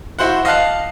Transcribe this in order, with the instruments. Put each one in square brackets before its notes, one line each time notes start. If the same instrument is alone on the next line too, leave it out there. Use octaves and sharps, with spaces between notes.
[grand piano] E4 F#4 C5 F#5
D#5 F5 A5 F#6 C7